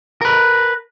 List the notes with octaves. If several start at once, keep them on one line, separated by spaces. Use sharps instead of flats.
A#4 B4